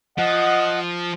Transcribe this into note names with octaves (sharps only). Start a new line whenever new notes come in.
F3 D#5 F#5